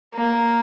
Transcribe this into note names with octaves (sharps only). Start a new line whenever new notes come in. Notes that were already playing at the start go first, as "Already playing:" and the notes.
A#3